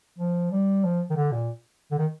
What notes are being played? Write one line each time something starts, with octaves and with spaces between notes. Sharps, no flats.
F3
G3
F3
D#3
D3
A#2
D3
D#3